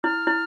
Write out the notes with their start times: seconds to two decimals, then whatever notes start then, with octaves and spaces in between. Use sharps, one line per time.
0.04 E4 F6
0.27 E4